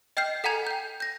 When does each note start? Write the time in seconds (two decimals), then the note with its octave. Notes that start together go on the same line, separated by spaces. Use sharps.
0.17 D#5 G5 F6 G6 C7
0.44 A4 F#5 G#5 A#5 G#6 F7
0.67 G5 G6
1.00 G6 A#6